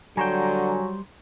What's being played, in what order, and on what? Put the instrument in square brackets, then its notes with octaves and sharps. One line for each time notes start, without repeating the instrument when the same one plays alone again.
[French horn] D3 [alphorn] F#3 [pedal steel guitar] G3 C5 G5 [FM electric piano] G#5 A#5 C#6